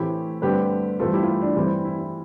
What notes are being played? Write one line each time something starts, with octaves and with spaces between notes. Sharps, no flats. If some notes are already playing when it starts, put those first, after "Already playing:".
Already playing: A2 E3 A3 C4 E4 G4
G2 D3 A3 C4 G4 B4
G2 E3 A3 C4 F4 A4
E4 G4
F4
E4
D4
G2 E3 G3 C4 E4
E4
E4